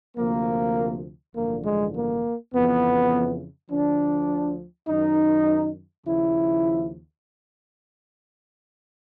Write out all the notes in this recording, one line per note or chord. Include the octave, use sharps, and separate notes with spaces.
D2 C3 F3 A#3
A1 G2 D3 F3 A#3
G#3
A#3
F2 C#3 E3 B3
D2 D3 F3 D4
F#2 D#3 D#4
D#2 C#3 F3 E4